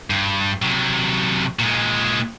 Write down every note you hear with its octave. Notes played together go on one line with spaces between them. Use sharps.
G2
C3 F#3
A#2 G#3